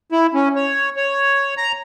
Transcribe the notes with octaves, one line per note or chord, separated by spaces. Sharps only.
E4
C#4
C#5
C#5
A#5